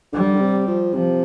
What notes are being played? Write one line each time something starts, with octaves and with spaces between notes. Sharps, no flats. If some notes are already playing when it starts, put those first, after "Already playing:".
D3 G3
D3
C3
F3
C3 F3